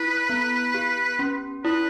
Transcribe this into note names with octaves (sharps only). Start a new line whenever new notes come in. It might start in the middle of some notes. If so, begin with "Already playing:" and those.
Already playing: E4 B4
B3
G4
C#4
E4 B4